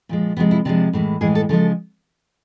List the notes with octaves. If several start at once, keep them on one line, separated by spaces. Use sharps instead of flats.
A#2 F3 G#3
C3 F3 G#3 B3
E4
C3 F3 G#3 D4
A2 E3 G#3
A2 E3 G#3 G#4
A4
C#3 F3 G#3 A4